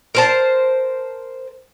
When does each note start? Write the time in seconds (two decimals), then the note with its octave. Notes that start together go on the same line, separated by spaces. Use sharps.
0.15 A#4 C5 A5